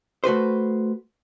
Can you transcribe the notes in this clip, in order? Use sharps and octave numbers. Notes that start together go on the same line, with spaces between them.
A3 F#4 B4 C5